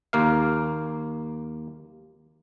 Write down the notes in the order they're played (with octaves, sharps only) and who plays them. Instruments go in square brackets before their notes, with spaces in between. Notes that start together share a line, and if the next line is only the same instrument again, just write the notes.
[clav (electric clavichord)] D#2 A#3 F5